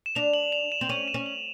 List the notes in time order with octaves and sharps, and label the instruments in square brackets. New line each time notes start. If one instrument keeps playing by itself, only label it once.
[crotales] E7
[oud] D4 [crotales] F7
[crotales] F#7
F7
E7
[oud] C4
[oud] C#4 [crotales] D#7
[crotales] E7
[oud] C#4
[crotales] F#7